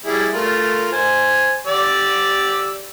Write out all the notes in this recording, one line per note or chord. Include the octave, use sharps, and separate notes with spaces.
G3 E4 G#4
A3 F4 A#4
C5 G#5
G4 D5 E6